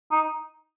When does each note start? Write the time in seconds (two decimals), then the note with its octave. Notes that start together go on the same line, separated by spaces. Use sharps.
0.11 D#4